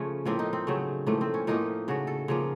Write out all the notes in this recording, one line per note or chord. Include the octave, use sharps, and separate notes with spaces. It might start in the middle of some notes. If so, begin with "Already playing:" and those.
Already playing: C#3 F3 A3 C#4
A2 F3 A#3 C4
D#4
C4
C#3 F#3 A3
A2 F3 A3 A#3
C4
C#4
A2 F3 A#3 D#4
C#3 A3 F#4
A4
C#3 F3 A#3